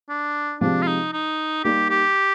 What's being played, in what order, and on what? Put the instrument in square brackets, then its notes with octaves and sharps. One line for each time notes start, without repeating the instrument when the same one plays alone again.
[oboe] D4
[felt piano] C3 F3 G#3 C4 G4 [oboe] D4
[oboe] F4
D#4
D#4
[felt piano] G3 A#3 D#4 [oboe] G4
[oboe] G4